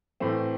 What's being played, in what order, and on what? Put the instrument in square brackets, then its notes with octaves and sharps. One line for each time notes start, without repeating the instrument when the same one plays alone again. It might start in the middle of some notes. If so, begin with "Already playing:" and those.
[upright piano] A2 E3 A3 C4